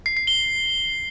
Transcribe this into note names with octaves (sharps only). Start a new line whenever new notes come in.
C7
C7
G7